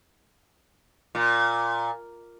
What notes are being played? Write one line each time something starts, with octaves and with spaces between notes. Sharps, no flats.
A#2